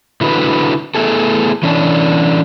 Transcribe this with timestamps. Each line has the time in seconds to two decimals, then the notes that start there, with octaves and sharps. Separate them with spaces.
0.21 D3 E4 F#4 B4
0.95 A3 B3 E4 G#4 A4
1.63 E3 C#4 D4